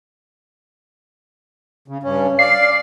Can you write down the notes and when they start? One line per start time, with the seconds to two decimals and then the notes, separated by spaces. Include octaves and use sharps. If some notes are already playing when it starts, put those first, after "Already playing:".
1.88 C#3
2.03 G2 C#4
2.39 D5 F5 C7